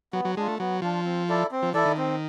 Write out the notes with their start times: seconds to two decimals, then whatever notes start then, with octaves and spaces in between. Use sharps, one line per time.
0.13 F#3 B3
0.25 F#3
0.37 G#3 D4 F4
0.48 A3
0.59 F#3 B3
0.82 F3 D4 F4
1.05 C4
1.29 E4 A4 D5
1.51 C4
1.63 F3
1.74 E3 E4 A4 D5
1.86 D#3
1.97 C4